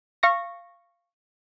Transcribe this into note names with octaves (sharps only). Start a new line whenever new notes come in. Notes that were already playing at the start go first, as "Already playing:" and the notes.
F5 C#6 A#6